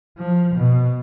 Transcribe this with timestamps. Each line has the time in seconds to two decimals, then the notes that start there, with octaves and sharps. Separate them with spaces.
0.18 F3
0.54 B2